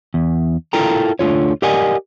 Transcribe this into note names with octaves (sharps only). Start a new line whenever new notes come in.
E2
E4 F4 A4 A#4 G5 A#5
D2 D3 F4 C#5
G4 A#4 D5 D#5 F#5 G#5